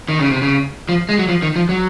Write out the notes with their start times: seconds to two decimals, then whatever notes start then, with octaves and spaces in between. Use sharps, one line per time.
0.09 D#3
0.19 C#3
0.31 C3
0.42 C#3
0.89 F3
1.09 G#3
1.19 F#3
1.29 F3
1.42 D#3
1.56 F3
1.69 F#3